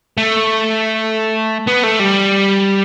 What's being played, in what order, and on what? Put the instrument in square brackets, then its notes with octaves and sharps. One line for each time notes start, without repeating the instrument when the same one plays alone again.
[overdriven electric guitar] A3
B3
A3
G3